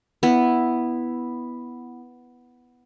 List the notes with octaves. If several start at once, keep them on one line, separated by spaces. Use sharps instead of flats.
B3 E4